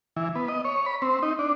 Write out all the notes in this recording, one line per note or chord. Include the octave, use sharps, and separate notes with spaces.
E3
B3
D#5
C#5
B5
C4
D#4
D4